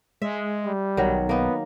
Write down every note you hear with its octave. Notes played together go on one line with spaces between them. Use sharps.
G#3 E5
G3
B1 D#3 F#3
A#3 B3 D#4